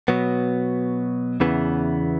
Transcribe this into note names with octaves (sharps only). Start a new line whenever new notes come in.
B2 F#3 B3
E2 C#3 E3 B3